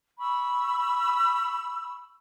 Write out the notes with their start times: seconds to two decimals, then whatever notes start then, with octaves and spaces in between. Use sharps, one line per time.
0.20 B5 C#6 E6